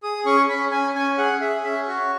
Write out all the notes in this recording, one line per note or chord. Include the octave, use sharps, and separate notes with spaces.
G#4 D#6
C#4 C#6
C#4 B5
C#4 G#5
C#4 G#5
G#4 F#5
G#4 E5
C#4 E5
F#4 C#5